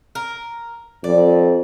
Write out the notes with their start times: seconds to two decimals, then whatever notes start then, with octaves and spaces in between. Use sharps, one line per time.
0.15 A#4
1.04 F2 D5